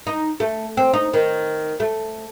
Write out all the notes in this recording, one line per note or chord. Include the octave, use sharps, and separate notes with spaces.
D#4
A3
C4
D#4
D#3
A3